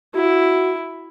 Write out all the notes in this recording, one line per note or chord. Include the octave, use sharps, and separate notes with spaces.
E4 F#4